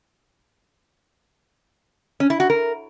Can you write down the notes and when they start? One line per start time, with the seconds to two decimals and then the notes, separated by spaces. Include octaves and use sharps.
2.20 C#4
2.30 E4
2.40 F#4
2.50 A#4